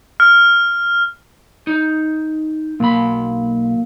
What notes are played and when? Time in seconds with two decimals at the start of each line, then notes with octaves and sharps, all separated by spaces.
0.20 F6
1.67 D#4
2.80 B1 A#3 B5